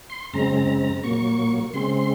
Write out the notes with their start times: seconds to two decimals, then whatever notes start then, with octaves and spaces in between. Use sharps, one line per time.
0.10 C6
0.34 F#2 C#3 G#3 C4 A#5
0.57 A#5
0.81 A#5
1.04 A#2 F#3 A#3 C#6
1.74 C#3 G#3 C4 C6
1.97 C6